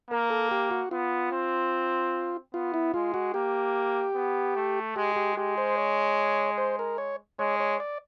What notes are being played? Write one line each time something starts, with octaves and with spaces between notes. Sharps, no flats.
A#3 A#4
A4
G4
F#4
B3 F4
C4
B3 F4
E4
G#3 F4
F#4
A#3 G4
B3
A3
G#3 G4
G4
G#3 G4
C5
C#5
C5
A#4
C#5
G#3 C#5
C#5
D5